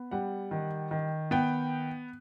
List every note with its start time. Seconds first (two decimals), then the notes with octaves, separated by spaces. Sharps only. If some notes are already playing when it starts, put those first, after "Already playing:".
Already playing: B3
0.11 G3 F#5
0.51 D#3
0.91 D#3
1.31 B3 G5